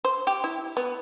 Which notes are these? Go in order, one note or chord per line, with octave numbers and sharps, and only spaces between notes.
C5
G4
E4
B3